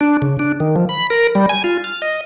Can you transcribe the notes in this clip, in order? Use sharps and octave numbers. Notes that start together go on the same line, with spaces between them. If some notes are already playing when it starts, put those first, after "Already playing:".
D4
C#3
D4
D#3
F3
B5
A#4
G3
G#5
F4
F6
D#5